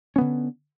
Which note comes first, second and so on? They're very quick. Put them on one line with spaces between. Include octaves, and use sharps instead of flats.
C#4 B3 D3